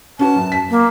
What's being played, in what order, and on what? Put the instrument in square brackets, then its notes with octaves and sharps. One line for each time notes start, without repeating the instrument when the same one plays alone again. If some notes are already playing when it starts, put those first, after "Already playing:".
[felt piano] C#4 F#4 B4 [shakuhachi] A5
[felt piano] F#2
B6
[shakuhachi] A#3